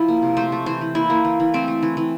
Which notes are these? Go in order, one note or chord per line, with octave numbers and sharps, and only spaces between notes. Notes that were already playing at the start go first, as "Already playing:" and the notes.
Already playing: F3 E4
A#3
C3
A3 C5
A3
E3 C5
E3
A#3 E4
A#3
E3
E3
A3 C4
A3
E3
E3